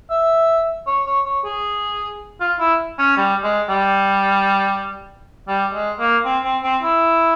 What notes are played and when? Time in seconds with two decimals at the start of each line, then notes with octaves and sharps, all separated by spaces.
0.10 E5
0.87 C#5
1.06 C#5
1.26 C#5
1.45 G#4
2.41 F4
2.60 E4
2.99 C#4
3.17 G3
3.44 G#3
3.69 G3
5.48 G3
5.74 G#3
5.99 A#3
6.25 C4
6.44 C4
6.63 C4
6.83 E4